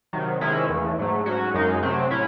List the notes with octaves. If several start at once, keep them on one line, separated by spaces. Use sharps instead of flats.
C3 D#3 F#3
C3 D#3 G#3 C#4 E4
E2 C#3 E3 A3
G#2 F#3 A3
G#2 F#3 C#4 F#4
F#2 C#3 G#3 D#4
C3 F#3 A3 C4
A2 F#3 C#4 E4